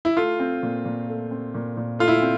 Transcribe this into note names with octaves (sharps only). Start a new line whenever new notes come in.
E4
A3 F4
C4
A#2
A#2
A3
C4
A#2
A#2
A3 F4
E4
C4